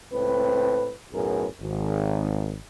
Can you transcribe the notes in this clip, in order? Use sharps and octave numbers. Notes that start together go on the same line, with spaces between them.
C#2 A2 C4 B4
B1 F#2 A2 G#4 A#4 B4
G#1